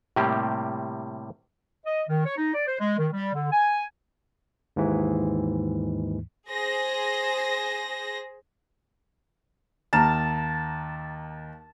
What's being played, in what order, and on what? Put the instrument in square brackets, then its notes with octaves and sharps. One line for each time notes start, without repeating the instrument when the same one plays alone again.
[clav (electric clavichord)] A2 C3 G3 A#3 G4
[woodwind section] D#5
D#3
C#5
D#4
D5
C5
G#3
D#3
G3
D3
G#5
[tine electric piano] D#2 G#2 E3
[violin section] G#4 C5 A#6
[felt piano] D#2 A#5 F6 [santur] A5